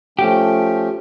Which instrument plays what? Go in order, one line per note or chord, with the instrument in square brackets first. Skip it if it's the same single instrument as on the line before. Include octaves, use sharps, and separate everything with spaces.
[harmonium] F3 A3 C#4 [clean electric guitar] G4